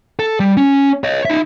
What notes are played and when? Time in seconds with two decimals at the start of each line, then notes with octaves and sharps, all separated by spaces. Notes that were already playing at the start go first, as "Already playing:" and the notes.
0.19 A4
0.40 G3
0.57 C#4
1.04 C#5 D#5
1.25 D#4 E5